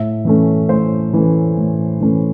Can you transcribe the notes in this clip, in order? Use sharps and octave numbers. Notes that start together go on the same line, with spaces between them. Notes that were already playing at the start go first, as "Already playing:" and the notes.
Already playing: A2 E5
E3 A3 C#4
A2 C5
E3 A3 C#4
A2
E3 A3 C#4